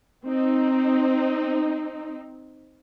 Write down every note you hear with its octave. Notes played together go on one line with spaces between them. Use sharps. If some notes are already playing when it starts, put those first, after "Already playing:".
C4 D#4